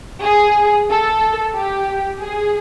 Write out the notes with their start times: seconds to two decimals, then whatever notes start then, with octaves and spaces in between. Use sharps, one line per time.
0.24 G#4
0.90 A4
1.55 G4
2.21 G#4